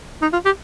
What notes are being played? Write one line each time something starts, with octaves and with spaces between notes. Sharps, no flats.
D#4
F4
G4